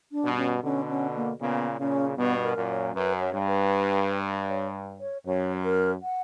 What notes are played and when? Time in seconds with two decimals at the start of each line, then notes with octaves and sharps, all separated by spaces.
0.12 D4
0.25 G2 B2
0.37 C#4
0.63 B2 D3 C#4
0.89 C#4
1.15 A#3
1.40 A#2 C#3 B3
1.79 A#2 C#3 C#4
2.17 G2 B2 B3
2.44 A#4
2.56 F#2 A#2
2.69 C#5
2.95 F#2 B4
3.21 C#5
3.33 G2
3.47 B4
4.49 C#5
5.00 C#5
5.26 F#2 C#5
5.64 A#4
6.03 F#5